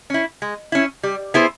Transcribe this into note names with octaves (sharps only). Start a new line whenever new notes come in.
C#4 E4
G#3
C#4 E4
G3
B3 E4 G#4 C5